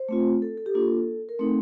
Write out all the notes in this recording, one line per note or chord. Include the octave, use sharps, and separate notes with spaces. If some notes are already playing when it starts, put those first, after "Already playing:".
Already playing: C5
A3 C4 F4
A4
A4
G4
A#3 D4 F4 A4
A#4
A3 C4 D#4 A4